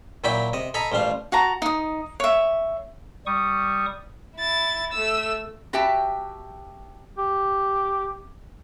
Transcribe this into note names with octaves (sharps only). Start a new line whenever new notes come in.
A#2 F#3 E4 D5 G5 B5
C3 D#5
A4 D#5 G#5 A#5 B5
A1 F3 G3 F5
F#4 A5 A#5
D#4 D#6
C#5 E5
G3 C#6 D#6
E4 A6
A3 E6
F#4 G4 E5 G5 A5
G4